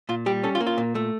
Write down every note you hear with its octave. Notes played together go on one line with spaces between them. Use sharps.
A#2 F4
G3 G4
C#4 A4
F4
A#3
F4
A#2
A3